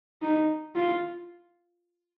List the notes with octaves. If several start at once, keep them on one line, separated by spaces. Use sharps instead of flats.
D#4
F4